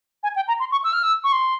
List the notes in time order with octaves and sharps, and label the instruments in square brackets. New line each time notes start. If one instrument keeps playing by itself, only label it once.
[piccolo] G#5
G5
A#5
C6
C#6
E6
F6
E6
C#6
C6